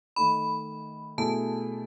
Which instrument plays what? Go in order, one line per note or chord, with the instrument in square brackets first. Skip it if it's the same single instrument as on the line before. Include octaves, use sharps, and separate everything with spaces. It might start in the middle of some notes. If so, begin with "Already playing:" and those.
[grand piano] D#3 A3 D#4 [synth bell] B5
[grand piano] B2 A3 E4 G#4 [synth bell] A5